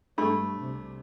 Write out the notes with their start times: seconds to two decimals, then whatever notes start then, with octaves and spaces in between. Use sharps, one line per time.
0.18 G2 A3 D4 B5 C#6
0.59 C2 C3